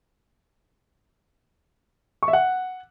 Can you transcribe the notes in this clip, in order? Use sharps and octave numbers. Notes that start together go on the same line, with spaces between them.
C#6
E5
F#5